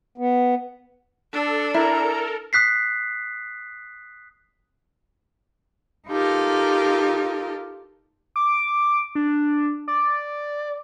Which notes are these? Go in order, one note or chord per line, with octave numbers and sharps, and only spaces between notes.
B3
D4 A4
E4 A4 A#4 A#5
D#6 F#6 B6 C7
D#4 F4 G4 A4 A#4
D6
D4
D5